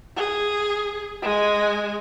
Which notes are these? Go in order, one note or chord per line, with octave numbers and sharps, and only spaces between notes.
G#4
G#3 G#5